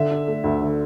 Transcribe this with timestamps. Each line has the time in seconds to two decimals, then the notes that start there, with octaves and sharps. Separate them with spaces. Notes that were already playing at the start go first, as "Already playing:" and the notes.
Already playing: D3 E5
0.11 D4
0.27 A3
0.44 D2
0.61 D3